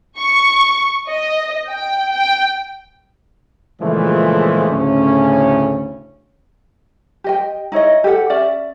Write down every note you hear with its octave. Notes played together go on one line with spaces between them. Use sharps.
C#6
D#5
G5
G5
A#2 C#3 E3 F3 G#3 A3
D2 A2 C#3 C#4
G4 D#5 G5
D#4 E4 C#5 D#5
G4 A4 D#5 F#5
C#4 D5 E5